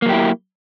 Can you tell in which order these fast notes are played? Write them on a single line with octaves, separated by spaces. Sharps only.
A#3 F#3 G4 E4